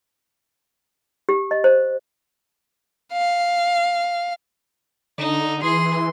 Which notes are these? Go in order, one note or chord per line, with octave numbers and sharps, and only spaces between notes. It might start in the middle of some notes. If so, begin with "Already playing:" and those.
G4
D#5
C5
F5
D3 D#4
E3 G#4 C6